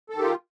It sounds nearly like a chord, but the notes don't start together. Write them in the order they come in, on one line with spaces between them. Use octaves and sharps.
A4 D#3 G4 F4